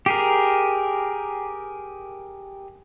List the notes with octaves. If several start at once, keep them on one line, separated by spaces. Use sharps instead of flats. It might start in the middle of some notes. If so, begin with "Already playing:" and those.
G4 G#4 A#4